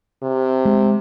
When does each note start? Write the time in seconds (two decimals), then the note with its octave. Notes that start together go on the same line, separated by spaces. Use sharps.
0.23 C3
0.65 G#3